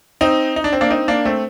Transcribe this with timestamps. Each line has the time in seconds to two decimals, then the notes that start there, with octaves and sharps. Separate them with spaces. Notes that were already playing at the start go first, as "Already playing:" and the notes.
0.21 C4 D#4
0.56 D#4
0.64 D4
0.73 C4
0.81 A#3 D4
0.90 C4 D#4
1.08 A#3 D4
1.25 A3 C4